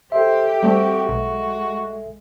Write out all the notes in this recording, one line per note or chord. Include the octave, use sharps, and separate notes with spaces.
G4 A4 C5 E5
G3 A3 C4 F#4
B1 G#3